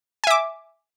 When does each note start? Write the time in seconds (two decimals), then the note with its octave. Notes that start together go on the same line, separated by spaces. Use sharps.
0.24 G#5
0.27 E5
0.30 D6